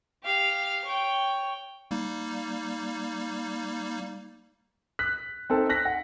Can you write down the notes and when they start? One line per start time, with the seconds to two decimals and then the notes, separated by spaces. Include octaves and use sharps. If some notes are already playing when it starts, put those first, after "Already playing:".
0.24 G4 F5
0.85 C#5 G5
1.91 G3 A#3 D#4
4.99 F#6 B6
5.50 C4 D#4 A4
5.69 F#6 A#6 B6
5.85 F#5